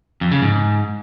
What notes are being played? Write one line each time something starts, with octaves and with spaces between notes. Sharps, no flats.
F2
C#3
G#2